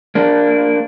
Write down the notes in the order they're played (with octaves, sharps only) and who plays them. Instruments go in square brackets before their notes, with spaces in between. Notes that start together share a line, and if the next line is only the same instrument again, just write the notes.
[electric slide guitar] A#3 D4